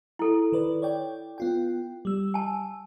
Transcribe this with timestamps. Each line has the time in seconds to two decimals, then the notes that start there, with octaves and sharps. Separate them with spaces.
0.19 E4 A4
0.52 D#3 B4 D5
0.82 C#5 D5 G5
1.38 B3 F4 G5
2.05 G3 E6
2.34 G#5 A5